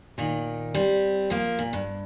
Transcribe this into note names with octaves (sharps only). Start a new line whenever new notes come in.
A#2 D#3
G3 C4
F3 A#3
A#2
G2